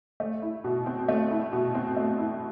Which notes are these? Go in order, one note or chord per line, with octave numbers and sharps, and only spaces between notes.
A3
E4
B2
C4
A3
E4
B2
C4
A3
E4